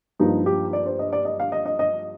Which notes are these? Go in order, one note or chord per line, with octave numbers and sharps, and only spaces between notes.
G2 F3 A#3 D#4
G4
D5
C5
D#5
D5
D#5
F5
D#5
D#5
D#5